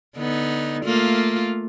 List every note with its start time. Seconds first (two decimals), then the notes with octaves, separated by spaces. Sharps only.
0.17 D3 B3 D#4
0.85 A3 A#3 F4